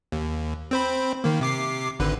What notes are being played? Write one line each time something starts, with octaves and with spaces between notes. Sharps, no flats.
D#2
C4 C5 B5
D#3 A#3
C3 D6 C7
G#1 D3 B4